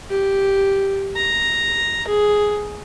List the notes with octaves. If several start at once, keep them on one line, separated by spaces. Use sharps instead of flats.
G4
A#5
G#4